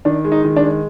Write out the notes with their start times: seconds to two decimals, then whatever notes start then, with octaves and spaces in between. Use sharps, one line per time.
0.05 D#3 D4
0.24 G#3
0.32 D#4
0.45 D#3
0.56 D4
0.64 G#3